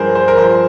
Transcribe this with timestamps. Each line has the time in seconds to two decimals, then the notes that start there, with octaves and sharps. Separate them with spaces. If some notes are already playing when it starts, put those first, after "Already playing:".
Already playing: G2 F3 G#4 A#4 C5
0.15 C5
0.28 A#4
0.38 F3 C5